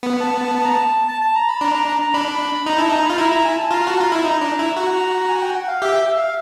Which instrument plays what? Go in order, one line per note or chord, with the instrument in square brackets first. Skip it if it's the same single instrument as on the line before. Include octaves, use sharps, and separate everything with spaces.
[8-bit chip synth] B3
[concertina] A5
A5
A5
A#5
A5
A5
A5
A#5
B5
[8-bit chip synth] D4 [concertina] A#5
[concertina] A#5
A#5
A#5
[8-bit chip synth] D4 [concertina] B5
[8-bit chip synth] D#4 [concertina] A#5
[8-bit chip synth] E4 [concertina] A5
[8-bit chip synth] D#4 [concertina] A#5
[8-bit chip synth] F4 [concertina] B5
[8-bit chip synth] E4 [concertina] A#5
[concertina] A#5
G#5
A5
[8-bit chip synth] F4 [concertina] A#5
[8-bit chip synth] F#4 [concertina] A5
[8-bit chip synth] F4 [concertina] A#5
[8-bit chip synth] E4 [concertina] B5
[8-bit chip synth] D#4 [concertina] A#5
[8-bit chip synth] D4
E4
F#4
[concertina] G#5
G5
F#5
F5
[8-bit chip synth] G4 [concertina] E5
[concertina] E5
F5